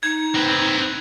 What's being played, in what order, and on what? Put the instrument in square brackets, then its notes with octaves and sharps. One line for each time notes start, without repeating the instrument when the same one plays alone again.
[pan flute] D#4 [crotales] G#6
[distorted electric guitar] C4 B4